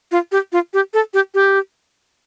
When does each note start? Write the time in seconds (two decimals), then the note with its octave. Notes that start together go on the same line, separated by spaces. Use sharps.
0.12 F4
0.32 G4
0.52 F4
0.74 G4
0.94 A4
1.14 G4
1.34 G4